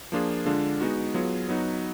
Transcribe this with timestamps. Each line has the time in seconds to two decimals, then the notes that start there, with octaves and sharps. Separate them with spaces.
0.12 F3 A#3 D4 F4 G#4
0.46 D3 G#3 D4 F4
0.81 G#3 B3 D#4 F#4
1.14 F#3 B3 F4 G#4
1.48 F#3 B3 D#4 F#4